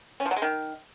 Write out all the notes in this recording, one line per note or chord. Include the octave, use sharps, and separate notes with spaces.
C#4
F3
F#3
G#3
D#3